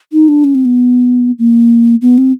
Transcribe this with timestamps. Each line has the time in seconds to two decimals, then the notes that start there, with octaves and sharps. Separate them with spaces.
0.13 D#4
0.28 D4
0.44 C#4
0.55 C4
0.65 B3
1.39 A#3
2.02 B3
2.18 C4